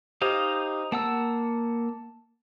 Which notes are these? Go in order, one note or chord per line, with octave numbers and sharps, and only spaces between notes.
D#4 G4 C5 D#5 F5 D#6
A#3 F#5 A5 E6